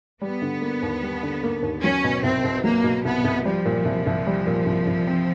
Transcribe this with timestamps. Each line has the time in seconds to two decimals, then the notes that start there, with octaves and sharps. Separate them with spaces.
0.21 G3 B3
0.42 D3
0.62 A#3
0.82 D#2
1.03 G3
1.23 D3
1.43 A#3
1.62 D#2
1.83 F#3 C#4
2.04 B2
2.23 C2 C4
2.44 C2
2.64 F#3 A#3
2.84 B2
3.05 C2 B3
3.24 C2
3.45 F3 G3
3.65 A#2
3.85 C2
4.06 C2
4.27 G3
4.47 A#2
4.66 C2
4.87 C2
5.07 C4